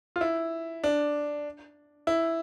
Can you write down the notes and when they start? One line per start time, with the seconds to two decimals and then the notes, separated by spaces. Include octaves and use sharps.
0.16 F4
0.21 E4
0.84 D4
2.07 E4